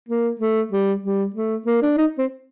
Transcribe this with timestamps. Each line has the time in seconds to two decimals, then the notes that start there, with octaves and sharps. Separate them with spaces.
0.09 A#3
0.40 A3
0.72 G3
1.03 G3
1.34 A3
1.66 A#3
1.82 D4
1.97 D#4
2.18 C4